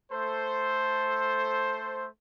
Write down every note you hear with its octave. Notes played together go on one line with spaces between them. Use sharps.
A3 A4 C5